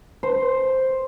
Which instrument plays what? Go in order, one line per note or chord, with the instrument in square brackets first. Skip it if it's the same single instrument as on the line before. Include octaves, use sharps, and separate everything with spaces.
[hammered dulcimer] C5